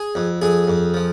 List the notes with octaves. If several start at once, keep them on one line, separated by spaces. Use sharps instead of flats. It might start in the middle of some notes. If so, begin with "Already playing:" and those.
Already playing: G#4
F2
F2 G#4
F2
F3